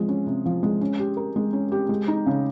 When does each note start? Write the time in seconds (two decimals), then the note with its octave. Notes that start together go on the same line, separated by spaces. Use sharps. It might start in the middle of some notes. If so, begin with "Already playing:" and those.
Already playing: F3 G#3
0.09 C#4
0.26 C3
0.46 F3
0.63 G#3
0.81 C#4
0.99 G4
1.17 A#4
1.36 G#3
1.53 C#4
1.72 G4
1.89 G#3
2.08 D#4
2.26 C#3